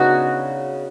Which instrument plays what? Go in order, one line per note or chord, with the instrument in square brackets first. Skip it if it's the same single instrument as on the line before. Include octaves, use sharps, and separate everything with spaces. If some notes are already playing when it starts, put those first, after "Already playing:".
Already playing: [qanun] C#3 B3 D4 D#4 F#4